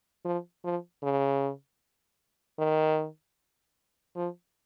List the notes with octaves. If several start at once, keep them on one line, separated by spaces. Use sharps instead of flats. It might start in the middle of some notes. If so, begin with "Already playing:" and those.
F3
F3
C#3
D#3
F3